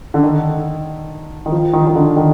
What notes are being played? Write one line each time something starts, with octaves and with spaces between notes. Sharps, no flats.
D3
D#3
D#3
F3
D#3
D#3
D3
D#3